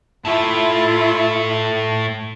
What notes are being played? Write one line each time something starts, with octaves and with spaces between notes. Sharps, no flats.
A2 A3 E4 F4